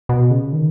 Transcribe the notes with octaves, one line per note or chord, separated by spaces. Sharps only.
B2
C#3
D#3